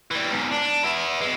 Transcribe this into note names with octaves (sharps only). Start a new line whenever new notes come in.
E3 G3
E2 G#2
D4
B3 E4
G#3 F#4